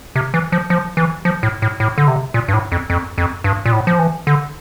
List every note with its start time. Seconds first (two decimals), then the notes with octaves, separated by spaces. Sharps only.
0.16 C3
0.34 E3
0.52 F3
0.70 F3
0.97 E3
1.25 F3
1.43 A2
1.62 A2
1.80 A2
1.98 D3
2.08 C3
2.34 A#2
2.48 G2
2.53 A2
2.72 F2
2.90 F2
3.18 F2
3.44 G2
3.66 A#2
3.72 A2
3.87 F3
3.99 E3
4.27 D3